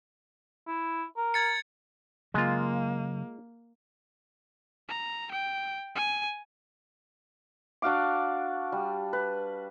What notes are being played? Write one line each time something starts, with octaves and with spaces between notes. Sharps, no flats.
E4
A#4
G#6 A6 C#7
C#3 F#3 G#3 A#3 F4
A#5
G5
G#5
D4 F#4 F5 D6
G3
B4